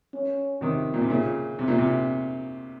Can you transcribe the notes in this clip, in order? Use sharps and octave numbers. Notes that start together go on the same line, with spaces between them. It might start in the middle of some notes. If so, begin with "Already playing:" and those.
C#4
C3 D#3
A#2
C3
A#2 C#3
C3
A#2
C3